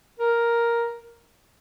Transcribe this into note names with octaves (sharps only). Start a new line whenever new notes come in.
A#4